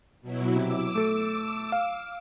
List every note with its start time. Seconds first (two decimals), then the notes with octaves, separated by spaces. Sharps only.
0.22 B2 F#3 E4
0.56 C3 D6 E6
0.95 A3 A4 D7
1.72 F5